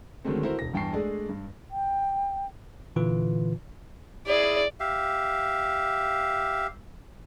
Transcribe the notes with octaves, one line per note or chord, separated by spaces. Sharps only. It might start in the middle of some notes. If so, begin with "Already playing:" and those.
D3 D#3 F#3 G#3 A3 C4
E4 F#4 A4 A#4 C5
E1 A#6
E2 G2 G5 A5 C#6 C7
G#3 A3 D4 G#4 A4 D5
G2
G5
A#2 D3 E3 F4 B4
E4 G#4 D5
G4 E5 F5